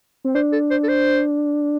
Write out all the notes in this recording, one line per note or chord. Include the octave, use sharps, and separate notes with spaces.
C4
D4 C5
A4
C5
A4
C5